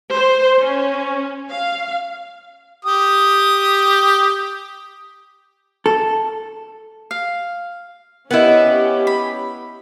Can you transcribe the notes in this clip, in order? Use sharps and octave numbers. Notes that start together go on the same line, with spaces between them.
C5
C#4
F5
G4 D#6
A4
F5
B3 C#4 E4 G4 A#4 D#5 F#5 G#5
B5